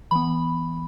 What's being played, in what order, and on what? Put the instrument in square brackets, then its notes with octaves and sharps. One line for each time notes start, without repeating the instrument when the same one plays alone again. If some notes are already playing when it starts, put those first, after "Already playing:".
[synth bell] E3 B3 B5